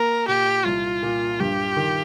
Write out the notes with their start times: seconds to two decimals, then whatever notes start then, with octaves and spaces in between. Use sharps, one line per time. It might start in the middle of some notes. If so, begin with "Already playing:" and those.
Already playing: A#3 A#4
0.28 A#2 G4
0.65 C2 F4
1.02 A#2
1.40 G2 G4
1.76 D#3